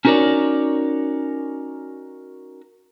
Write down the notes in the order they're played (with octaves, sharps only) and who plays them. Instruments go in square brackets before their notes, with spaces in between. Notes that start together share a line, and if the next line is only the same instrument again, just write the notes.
[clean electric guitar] C#4 D#4 F#4 A#4 C#5 D5